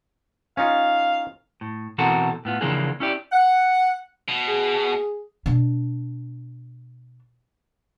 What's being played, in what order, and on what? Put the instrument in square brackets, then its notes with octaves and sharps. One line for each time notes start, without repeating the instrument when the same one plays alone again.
[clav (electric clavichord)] C#4 D#4 F4 [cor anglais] F5
[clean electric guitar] A2
B2 E3 C4 F#4 A4 A#4
A2 B3 F4
C#3 E3 F3 A#3 D4 G#4
C#4 E4 G4 D5
[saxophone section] F#5
[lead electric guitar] B2
[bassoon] G#4
[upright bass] B2 D4